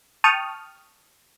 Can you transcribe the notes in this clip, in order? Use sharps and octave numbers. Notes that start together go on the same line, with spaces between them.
G5 A5 C#6 D#6 F6